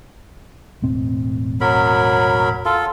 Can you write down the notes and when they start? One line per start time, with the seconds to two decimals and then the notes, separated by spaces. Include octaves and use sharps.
0.82 E1 A2 C4
1.61 F#3 A#4 B5
2.65 F4 A4